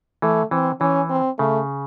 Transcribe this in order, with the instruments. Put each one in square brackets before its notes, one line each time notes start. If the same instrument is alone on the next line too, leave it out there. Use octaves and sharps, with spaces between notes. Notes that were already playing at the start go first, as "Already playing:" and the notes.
[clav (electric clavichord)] E3 [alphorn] A3
[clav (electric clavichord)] E3 [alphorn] C4
[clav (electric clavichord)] E3 [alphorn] C#4
[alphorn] C4
[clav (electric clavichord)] C#3 [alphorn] A3